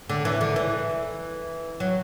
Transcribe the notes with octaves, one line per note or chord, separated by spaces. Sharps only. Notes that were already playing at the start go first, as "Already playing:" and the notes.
D3
E3
D3
E3
F#3